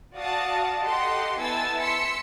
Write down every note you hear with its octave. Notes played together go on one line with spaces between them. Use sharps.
F#4 D5 F5 A5 D#6
G4 A4 D#5 F#5 C6
B3 E4 G#5 A5 E6 A6
C6 E6 B6 C#7